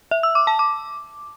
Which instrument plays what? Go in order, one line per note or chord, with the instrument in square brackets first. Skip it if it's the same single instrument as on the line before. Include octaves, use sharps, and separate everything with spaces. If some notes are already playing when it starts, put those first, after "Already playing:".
[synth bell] E5
E6
D6
A5
D6